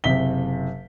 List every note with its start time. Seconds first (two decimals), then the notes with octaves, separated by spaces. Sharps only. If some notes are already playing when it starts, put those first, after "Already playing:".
0.04 F#1 C3 B6 G7